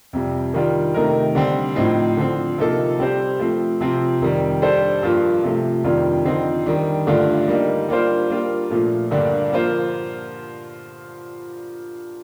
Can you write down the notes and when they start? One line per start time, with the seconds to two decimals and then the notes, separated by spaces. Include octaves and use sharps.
0.13 F2 C3 G3
0.54 D#3 G3 D4 F4
0.94 C3 D#3 A3 D#4 A#4
1.35 D3 G3 C4
1.76 A2 F3 C4 D#4
2.17 D3 F3 C4
2.58 C3 F3 A#3 D#4 A4
2.98 G3 C4 G4 C5
3.39 F3 A3 C4
3.80 C3 F3 C4
4.21 F2 D#3 G3
4.62 G3 D4 A4 C5
5.02 G2 F3 A#3 F4
5.44 C3 F3 A3
5.84 F2 D#3 G3 D4 F4
6.25 D3 F3 C4 D#4
6.66 D#3 G3 D4
7.07 G2 D3 A3 D4 F4
7.48 G3 A#3 D#4
7.88 G3 A#3 D4 F4 C5
8.30 G3 A#3 D4 F4
8.70 A#2 F3 A3
9.11 G2 D3 G3 A#3 D4
9.52 F3 A#3 F4 C5